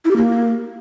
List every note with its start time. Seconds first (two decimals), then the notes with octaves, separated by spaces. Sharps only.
0.05 E4
0.11 G4
0.16 A#3